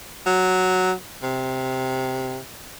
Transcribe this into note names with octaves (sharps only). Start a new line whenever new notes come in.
F#3
C3